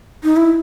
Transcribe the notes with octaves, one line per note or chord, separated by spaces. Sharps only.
D#4
E4